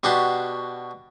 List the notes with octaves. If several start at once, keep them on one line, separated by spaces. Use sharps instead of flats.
B2 D4 F#4 G4 C6